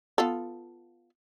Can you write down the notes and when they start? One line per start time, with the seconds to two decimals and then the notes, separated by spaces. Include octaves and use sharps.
0.18 B3 F4 A4